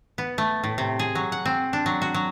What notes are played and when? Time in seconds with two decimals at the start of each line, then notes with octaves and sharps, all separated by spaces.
0.18 B3
0.38 A3
0.64 A2
0.78 C3
0.99 G#4
1.15 F#3
1.32 F#5
1.46 C4
1.73 D4
1.86 F#3
2.02 F#4
2.14 F#3